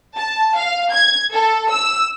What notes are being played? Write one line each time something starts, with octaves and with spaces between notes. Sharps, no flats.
A5
F5
G#6
A4
E6